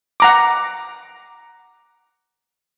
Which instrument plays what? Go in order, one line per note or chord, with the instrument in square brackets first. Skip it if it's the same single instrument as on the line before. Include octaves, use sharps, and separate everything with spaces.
[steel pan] F#5 A#5 D6